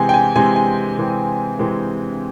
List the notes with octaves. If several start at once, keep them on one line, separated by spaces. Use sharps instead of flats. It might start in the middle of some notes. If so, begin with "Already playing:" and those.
Already playing: C3 E3 G#3 C4 G#5
G5
G#5
C3 E3 G#3 C4 G#5
G#5
C3 E3 G#3 C4
C3 E3 G#3 C4